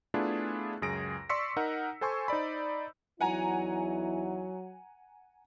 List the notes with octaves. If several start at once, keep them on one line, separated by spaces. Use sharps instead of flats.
A3 B3 D4 E4 F4 G#4
C#2 F#2 G#4 A#6 D7
D5 C6 C#6 E6 B6 C#7
D#4 A#4 F#5
A4 C5 G#5 C6 C#6 E6
D#4 C5 D5 B5
E2 F#3 D#4 E4 F#5 G#5 A#5